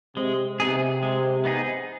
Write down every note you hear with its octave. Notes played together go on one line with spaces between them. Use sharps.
C3 G#3
C3 B3 D#4 G#4
G#3
B3 D#4 G#4